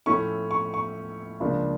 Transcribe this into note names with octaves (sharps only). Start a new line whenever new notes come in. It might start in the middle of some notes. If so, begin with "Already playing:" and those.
A2 F3 A3 C#4 E4 C#6
C#6
C#6
C#2 C#3 F3 A#3 D4